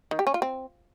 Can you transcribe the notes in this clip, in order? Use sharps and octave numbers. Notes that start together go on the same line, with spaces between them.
D#3
G4
C#4
F4
C4